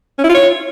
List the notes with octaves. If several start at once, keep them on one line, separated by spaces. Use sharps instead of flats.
C#4
E4
F4
C#5